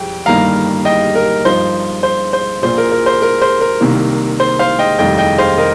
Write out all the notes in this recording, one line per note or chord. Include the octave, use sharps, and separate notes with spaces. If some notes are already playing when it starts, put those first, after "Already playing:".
Already playing: F2 G3 G5
G1 G2 D#3 G3 A#3 F5 A#5
D#5 G5
A#4
G2 F3 D#4 C5
C5
C5
A#1 A#2 A#3 F4 C5
A#4
A#4
C5
A#4
C5
A#4
C2 C3 D#3 A#3
C5
C5 F5
D#5 G5
F1 D#2 D#3 G3 D#5 G5
D#5 G5
C5 F5
A#4 D#5